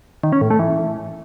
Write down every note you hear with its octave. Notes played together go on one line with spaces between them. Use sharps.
D#3
C#4
A2
A3
E3